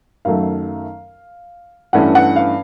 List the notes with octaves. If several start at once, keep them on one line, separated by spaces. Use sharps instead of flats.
F#2 D#3 F#3 A3 F5
G2 E3 A3 C#4 F#5
F#5
F5